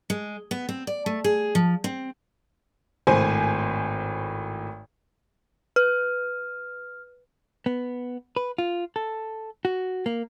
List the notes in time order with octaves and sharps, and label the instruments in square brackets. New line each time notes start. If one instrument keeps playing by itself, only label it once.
[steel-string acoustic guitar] G#3
B3
C4
D5
A3
G#4
F3
C4
[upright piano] G#1 A2 C5 G#5
[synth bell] B4 [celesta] F6
[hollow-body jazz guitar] B3
B4
F4
A4
F#4
A#3